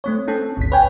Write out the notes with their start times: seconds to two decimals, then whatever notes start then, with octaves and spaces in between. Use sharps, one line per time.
0.04 A3 C4 C#5
0.28 C4 C#4 A4
0.57 G#1 D2 B6
0.72 B4 C#5 G5 G#5